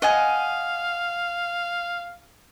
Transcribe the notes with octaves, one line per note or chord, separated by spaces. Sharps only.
D#5 F5 F#5 G#5